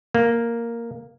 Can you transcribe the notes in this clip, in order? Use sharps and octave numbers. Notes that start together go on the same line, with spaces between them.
A#3